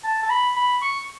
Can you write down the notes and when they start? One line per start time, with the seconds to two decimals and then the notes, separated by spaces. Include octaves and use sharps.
0.04 A5
0.22 A5
0.30 B5
0.56 B5
0.82 C#6